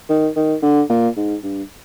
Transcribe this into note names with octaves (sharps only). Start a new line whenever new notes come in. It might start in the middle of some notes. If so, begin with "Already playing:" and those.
D#3
D#3
D3
A#2
G#2
G2